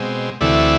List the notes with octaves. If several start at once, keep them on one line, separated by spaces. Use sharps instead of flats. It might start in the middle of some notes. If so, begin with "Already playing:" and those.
Already playing: B2 G#3 C4
D2 C3 E3 A3 D5 E5